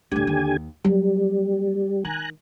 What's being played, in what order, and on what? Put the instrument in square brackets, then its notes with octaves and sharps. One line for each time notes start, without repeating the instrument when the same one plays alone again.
[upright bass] D2 A2 [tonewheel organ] D3 G4 G#5
[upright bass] D#2
[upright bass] F#3 A#3 [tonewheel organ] G3
[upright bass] D#3 [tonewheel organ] G#5 A#5 F#6